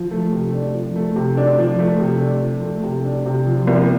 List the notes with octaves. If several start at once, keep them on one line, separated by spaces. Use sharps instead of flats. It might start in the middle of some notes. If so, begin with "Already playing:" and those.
Already playing: F3
A3
C3
D4
F3
A3
C3
D4
F3
A3
C3
D4
F3
A3
C3
D4
C3
F3
C2